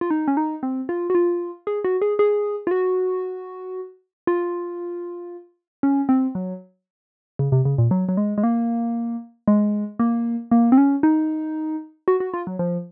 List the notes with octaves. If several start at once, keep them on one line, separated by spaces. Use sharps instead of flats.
F4
D#4
C#4
D#4
C4
F4
F#4
F4
G#4
F#4
G#4
G#4
F4
F#4
F4
C#4
C4
F#3
C#3
C3
C#3
A#2
F#3
F#3
G#3
G#3
A#3
G#3
A#3
A#3
C4
C#4
D#4
F#4
F#4
F4
F#3
F3